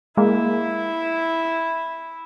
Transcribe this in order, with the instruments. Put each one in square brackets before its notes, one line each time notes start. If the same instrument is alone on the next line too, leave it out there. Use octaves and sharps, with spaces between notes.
[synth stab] G#3 A#3 [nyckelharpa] E4